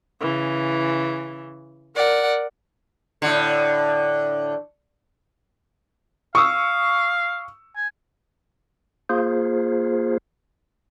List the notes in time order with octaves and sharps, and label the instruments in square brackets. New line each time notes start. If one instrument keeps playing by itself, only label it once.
[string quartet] C#3 E3
A#4 D5 F#5
[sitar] A2 D3
[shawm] F5 [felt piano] C#6 D#6 E6
[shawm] G#5
[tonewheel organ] A#3 F4 G#4 C5